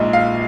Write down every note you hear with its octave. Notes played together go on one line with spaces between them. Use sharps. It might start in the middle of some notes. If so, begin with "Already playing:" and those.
Already playing: A#1 A#2 G#3 D#4
F5